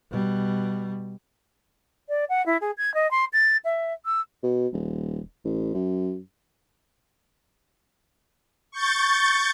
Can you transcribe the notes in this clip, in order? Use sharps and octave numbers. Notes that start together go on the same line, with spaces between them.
B2 G3
D5
F#5
E4
G#4
G#6
D#5
C6
A6
E5
E6
B2
D#1
A1
F#2
C#6 G6 A6